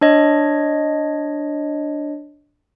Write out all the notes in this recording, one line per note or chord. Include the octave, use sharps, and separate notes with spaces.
D4 C#5 D#5